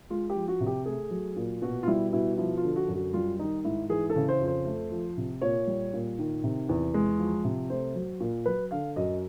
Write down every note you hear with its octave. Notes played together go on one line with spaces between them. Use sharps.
G#3 F4
G4
F3
F#4
C3
G4
A3 G#4
F#3
A#2
B2 F#4
F4
G3 E4
B2 E4
F3 E4
F4
D3
F#4
F#2
F#4
G3 F4
D#3 D#4
G#2 E4
E3 G#4
A4
C#3
C5
F2
C5
A3
F3
C3
A#2 C#5
G3
A#2
D#3
C3
E2
G#3
F3
C3
A3 C5
F#3
A#2
F#3 B4
D3 F5
F#2 D#5